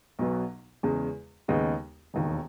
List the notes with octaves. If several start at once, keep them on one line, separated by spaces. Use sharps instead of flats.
B1 B2 F#3 B3
E2 C#3 G#3
D#2 C#3 G#3 B3 D#4
E1 D#2 D#3